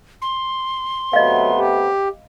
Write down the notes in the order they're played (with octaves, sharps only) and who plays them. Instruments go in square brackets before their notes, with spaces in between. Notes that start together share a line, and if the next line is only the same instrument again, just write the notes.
[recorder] C6
[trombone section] C3 A3 B3 [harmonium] F#3 [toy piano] D#5 F5
[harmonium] G4